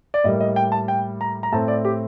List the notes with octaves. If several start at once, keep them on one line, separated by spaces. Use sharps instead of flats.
D5
A2 G3 A#3 D#5
D#5
G5
A5
G5
A#5
A#5
A2 A3 C4 A5
D5
G4